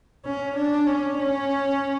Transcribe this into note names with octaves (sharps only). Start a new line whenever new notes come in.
C#4
D4
C#4
C#4